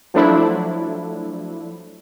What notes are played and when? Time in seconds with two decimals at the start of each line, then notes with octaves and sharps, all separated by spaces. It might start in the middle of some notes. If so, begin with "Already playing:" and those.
0.14 F3 F#3 A3 D4 E4